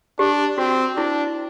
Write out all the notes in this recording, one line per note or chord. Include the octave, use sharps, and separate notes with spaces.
D4 G4
C4 F#4
D4 E4